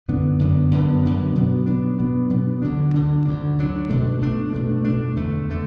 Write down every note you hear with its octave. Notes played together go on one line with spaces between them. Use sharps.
F#2 D3 B3 D4
F#2 D3 B3 D4
F#2 D3 B3 D4
F#2 D3 B3 D4
B2 F#3 B3 D4
B2 F#3 B3 D4
B2 F#3 B3 D4
B2 F#3 B3 D4
D2 D3 F#3 D4
D2 D3 F#3 D4
D2 D3 F#3 D4
D2 D3 F#3 D4
B2 A3 D4
B2 A3 D4
B2 A3 D4
B2 A3 D4
E2 D3 A3
D3 A3